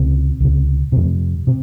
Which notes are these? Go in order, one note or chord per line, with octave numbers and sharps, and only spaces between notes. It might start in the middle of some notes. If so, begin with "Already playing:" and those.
Already playing: C#2 C3 C4
C#2 C3
F2 C3
C3